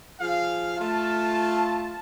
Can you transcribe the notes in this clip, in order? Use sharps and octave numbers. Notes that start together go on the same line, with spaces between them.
F3 G#4 F5
A3 F4 A5